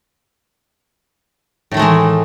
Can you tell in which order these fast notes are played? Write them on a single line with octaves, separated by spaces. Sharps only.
A2 D#3 A3 G#3 E3